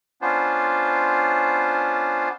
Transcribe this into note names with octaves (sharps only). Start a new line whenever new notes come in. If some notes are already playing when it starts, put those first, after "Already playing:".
B3 C#4 D4 F4 C5